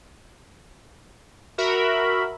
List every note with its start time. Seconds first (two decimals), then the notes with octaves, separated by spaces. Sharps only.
1.58 F#4 A#4 E5 B5